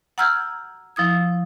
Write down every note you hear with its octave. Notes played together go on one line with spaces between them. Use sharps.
F#5 A#5 E6 F6 G6 G#6
F3 E4 D#6 G#6